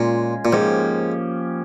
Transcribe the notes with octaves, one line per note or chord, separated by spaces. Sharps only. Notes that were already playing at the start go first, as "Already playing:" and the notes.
Already playing: A#2 G#3 C#4 F4
A#2
G#2 F3 A#3 C#4 G4